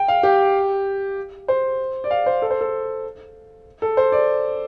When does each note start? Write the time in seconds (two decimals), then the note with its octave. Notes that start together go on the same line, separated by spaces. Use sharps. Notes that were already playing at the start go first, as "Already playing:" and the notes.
Already playing: G5
0.08 F5
0.23 G4
1.48 C5
2.04 D5
2.11 F5
2.26 C5
2.42 A4
2.50 C5
2.61 A4
3.82 A4
3.97 C5
4.12 D5